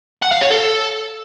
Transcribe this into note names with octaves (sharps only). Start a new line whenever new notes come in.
F#5
F5
C#5
A4